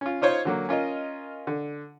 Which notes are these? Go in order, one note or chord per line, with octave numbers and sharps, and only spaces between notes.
C#4 F4
D#4 F4 C5 C#5
D3 F#3 A#3
C#4 F4 A#4 D#5
D3